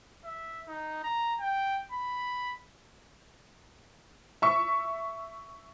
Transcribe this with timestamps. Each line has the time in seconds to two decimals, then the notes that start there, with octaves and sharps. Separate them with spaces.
0.25 E5
0.68 D#4
1.04 A#5
1.40 G5
1.92 B5
4.42 E5 C#6